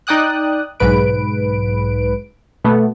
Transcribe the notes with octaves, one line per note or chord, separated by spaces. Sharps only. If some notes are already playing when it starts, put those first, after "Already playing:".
D#4 D5 G5 D#6 F#6
B1 G#2 B4 D7
B2 A3 B3